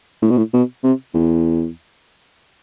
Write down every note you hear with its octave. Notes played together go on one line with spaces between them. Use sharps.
A2
B2
A2
B2
C3
E2